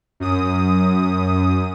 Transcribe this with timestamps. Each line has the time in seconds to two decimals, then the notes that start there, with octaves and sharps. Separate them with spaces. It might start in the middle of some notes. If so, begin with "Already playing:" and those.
0.20 F#2 D#6